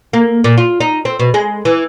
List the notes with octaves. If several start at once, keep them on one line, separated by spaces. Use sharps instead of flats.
A#3
A#2
F4
D#4
C4
B2
G#3
E3